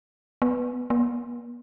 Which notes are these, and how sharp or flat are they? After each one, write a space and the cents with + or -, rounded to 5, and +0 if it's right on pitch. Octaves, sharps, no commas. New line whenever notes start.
B3 +0
B3 -45